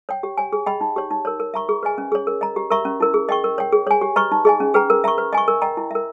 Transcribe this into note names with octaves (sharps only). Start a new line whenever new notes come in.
C#5 G5
G4
C#5 G#5
G#4
D#5 G5 B5
D#4
G4 C#5
D#4
A#4 C#5
A#4
E5 A#5 C#6
G#4
B4 D#5 G#5
C#4
G#4 C#5
A#4
D#5 A#5
G4
A#4 E5 A#5 C#6
C#4
E4 A#4
G#4
D#5 G5 C#6
A#4
C#5 G5
G#4
C#5 G#5
G4
B4 D#5 A#5 C#6
D#4
G#4 D#5 G#5
C#4
G#4 B4 G5 A#5
A#4
E5 A#5 C#6
B4
D#5 G#5 C#6
A#4
D#5 G5 A#5
E4
A#4 E5